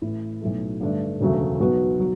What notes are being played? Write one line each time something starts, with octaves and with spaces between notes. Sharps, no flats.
A1 A2 E3 A3 E4
B1 A2 F#3 A3
G2 D3 A3 D4
E1 D2 C#3 F#3 A3
B1 B2 F#3 B3 F#4
B2 F#3